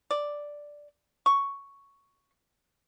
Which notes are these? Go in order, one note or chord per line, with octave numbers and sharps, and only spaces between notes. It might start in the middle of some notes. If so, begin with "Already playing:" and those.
D5
C#6